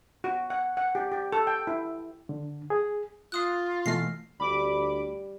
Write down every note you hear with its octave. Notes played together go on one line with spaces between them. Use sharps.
F#4
F#5
F#5
G4
G4
A4
G5
E4
D3
G#4
F4 F5 D#6 F#6
B2 E3 A3 F6 A#6 C7
D2 G3 B5 D6 D7